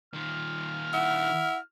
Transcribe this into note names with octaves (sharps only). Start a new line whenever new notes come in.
D#3 F4 F6
E4 F#5